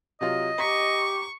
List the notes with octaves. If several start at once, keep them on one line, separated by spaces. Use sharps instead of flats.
C3 F#3 F4 D#5
G4 A#5 C#6 B6